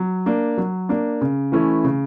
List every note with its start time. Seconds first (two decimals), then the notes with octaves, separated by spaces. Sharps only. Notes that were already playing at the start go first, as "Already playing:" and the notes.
Already playing: F#3
0.26 A#3 D4
0.58 F#3
0.89 A#3 D4
1.21 C#3
1.52 E3 A3 C#4 E4
1.84 C#3